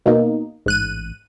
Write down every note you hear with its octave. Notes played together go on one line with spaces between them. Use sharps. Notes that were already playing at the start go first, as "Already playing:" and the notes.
B2 A#3 D#4
A1 G#2 F#6 D#7